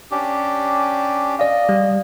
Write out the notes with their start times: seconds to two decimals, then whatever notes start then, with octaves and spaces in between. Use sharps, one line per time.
0.11 C#4 D4 G4
1.39 D5 D#5 F5
1.69 G3